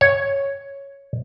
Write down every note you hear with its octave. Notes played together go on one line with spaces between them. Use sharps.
C#5